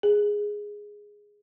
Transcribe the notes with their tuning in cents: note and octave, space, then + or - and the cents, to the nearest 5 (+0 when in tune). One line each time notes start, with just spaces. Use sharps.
G#4 -5